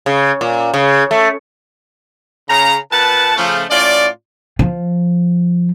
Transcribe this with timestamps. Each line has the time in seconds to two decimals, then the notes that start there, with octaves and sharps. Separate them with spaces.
0.06 C#3
0.41 A#2
0.74 C#3
1.11 A3
2.49 C#3 A#5
2.92 A#2 B4 F#5 A5
3.37 C#3 F3 A3
3.70 A2 C#4 F4 D5
4.59 F3